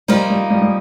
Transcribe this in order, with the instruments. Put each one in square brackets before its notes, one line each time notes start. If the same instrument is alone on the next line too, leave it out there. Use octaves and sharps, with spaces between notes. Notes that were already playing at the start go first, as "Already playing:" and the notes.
[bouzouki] F3 A#3 D#4 [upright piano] G3
[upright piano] G3
G3
G3